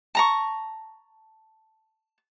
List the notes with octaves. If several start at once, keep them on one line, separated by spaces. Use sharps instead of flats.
A5 A#5 C#6